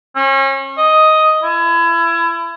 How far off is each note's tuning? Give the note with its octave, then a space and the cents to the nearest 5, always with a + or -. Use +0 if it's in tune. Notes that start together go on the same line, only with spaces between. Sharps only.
C#4 -35
D#5 +5
E4 +30